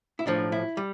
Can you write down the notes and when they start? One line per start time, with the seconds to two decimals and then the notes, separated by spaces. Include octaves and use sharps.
0.19 E4
0.26 B1 A2 F3 D4
0.52 E4
0.77 G3